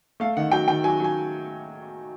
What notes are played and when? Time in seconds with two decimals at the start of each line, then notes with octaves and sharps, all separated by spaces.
0.20 A3 F5
0.37 D#3 F#5
0.51 F#3 G5
0.68 D#3 G5
0.84 F#3 G#5
1.00 F#3 G#5